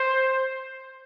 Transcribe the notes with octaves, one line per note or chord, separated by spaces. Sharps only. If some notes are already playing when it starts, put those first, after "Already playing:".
Already playing: C5